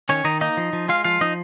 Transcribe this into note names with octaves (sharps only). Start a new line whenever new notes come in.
D#3 C#4 C#5
D#3 D#4 D#5
A#3 D#4 D#5
F3
F3
G#3 F4 F5
F3 F4 F5
F3 D#4 D#5